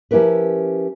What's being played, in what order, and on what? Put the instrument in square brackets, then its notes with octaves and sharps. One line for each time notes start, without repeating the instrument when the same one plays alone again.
[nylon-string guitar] F3 C#4 E4 G4 A#4 B4